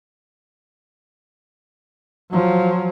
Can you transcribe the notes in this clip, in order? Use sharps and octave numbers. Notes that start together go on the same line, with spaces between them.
F3 F#3